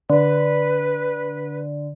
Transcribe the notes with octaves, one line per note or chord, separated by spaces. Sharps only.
D3 B4